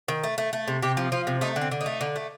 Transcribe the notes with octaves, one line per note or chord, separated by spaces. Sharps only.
D#3
A3
A3
A3
C3
C3 G4
F3
F3 F4
C3
A3 D#4
D3
C4
D3
D#4
A3
D3
A3